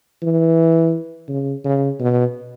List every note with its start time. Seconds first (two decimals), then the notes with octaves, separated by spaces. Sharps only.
0.22 E3
1.29 C#3
1.65 C#3
2.00 B2